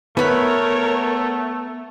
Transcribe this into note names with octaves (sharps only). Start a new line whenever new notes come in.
A3 B3 A#4 B4 C#5 B5